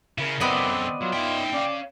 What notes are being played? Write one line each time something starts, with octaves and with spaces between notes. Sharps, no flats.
C#3 E4 A#4
F#2 D3 B3 C4 D5 D#5
F#3 F4
D#4 C#5 E5 G5
C#4 D5 F5